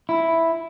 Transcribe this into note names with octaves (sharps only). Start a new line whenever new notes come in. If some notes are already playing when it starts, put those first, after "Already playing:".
E4